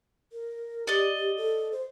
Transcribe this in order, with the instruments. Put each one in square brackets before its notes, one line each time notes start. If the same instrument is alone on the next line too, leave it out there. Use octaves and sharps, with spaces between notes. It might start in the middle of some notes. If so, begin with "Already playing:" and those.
[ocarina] A#4
[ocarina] G4 [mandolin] D5 D#5
[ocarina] G4
A4
C5